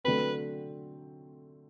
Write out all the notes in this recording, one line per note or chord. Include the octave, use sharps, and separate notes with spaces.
D3 F#3 A3 C4 B4